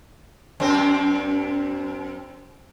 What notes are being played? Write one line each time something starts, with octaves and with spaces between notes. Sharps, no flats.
F#2 C4